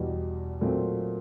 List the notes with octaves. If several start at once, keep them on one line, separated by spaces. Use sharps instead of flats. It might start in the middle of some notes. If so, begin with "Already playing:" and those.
Already playing: E2 B2 G3
A#2 F#3 A3 C4 F4